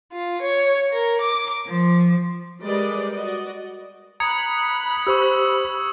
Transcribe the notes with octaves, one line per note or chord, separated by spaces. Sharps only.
F4
C#5
A#4
D6
F3
G3 G#3 A#4 B4 D5 D#5
F#4 D5 D#5
A#5 B5 D#6 F#6 G#6 C#7
G4 C5 C#6 E6